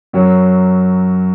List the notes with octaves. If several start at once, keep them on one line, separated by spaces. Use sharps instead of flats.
F#2 F#3